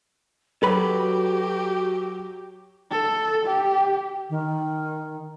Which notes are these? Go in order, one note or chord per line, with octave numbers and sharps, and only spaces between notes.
F#3 F#4 G4 A4 B4 B5
A4
G4
D#3